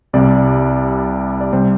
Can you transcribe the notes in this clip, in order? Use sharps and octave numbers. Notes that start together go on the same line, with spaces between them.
C2 C3 G3 D5
D5
C3 G3 C5